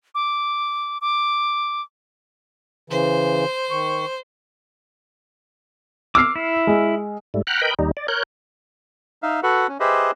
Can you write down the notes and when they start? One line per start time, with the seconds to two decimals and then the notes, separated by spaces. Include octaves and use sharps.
0.15 D6
1.01 D6
2.90 C#3 E3 C5
3.71 D#3 C#6
6.15 D6 E6 F6 C7
6.36 E4
6.67 G#3
7.34 G#2 G3 A3
7.47 F#5 G5 A#5 B5 F6 F#6
7.62 A#4 B4 D#5 G5 B5 G6
7.79 D#2 G3 D#4
7.97 D5
8.08 A#4 C#5 F#6 G6
9.23 D#4 E5 F5
9.43 F#4 A4 B4 F#5
9.68 C#4
9.80 G4 G#4 B4 C5 D#5 E5